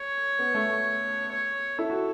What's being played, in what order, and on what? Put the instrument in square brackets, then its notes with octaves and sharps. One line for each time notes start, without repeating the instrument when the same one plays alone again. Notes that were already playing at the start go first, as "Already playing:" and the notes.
Already playing: [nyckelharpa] C#5
[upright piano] B3
A3
[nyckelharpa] C#5
[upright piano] E4 [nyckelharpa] A4
[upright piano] F#4